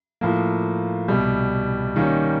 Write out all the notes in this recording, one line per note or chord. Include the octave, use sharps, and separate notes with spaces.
A2 F3 A#3
C2 B2 G3
D#3 G3 A#3 C#4